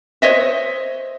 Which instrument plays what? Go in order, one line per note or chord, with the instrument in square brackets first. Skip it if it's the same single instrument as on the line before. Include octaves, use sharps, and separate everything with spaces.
[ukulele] C5 C#5 D#5 E5